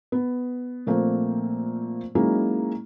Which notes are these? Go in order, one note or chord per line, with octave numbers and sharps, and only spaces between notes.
B3
A#2 F3 A3 A#3 C4
F#3 G#3 A#3 C#4 D#4 E4